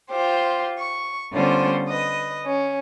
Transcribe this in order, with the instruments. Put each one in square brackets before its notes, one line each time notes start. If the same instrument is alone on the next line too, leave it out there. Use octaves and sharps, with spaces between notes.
[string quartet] F4 G4 C5
C#6
D3 G3 B3 C#4 F4 C5
B4 D#5
C#4